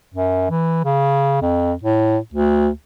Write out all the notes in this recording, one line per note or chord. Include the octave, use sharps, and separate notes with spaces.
F#2
E3
C#3
F2
A2
D2